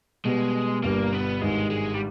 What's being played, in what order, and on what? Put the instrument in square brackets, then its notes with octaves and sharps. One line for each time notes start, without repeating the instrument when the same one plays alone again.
[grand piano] B2 G3 B3 [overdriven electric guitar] G#3
[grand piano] G1 G2 G3 [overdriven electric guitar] A#3
[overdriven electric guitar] B3
[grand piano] G#1 G#2 G3 [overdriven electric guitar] G#3
[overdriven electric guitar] G#3
G3